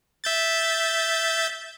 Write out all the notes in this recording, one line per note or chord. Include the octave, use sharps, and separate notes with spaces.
E5 G6 A6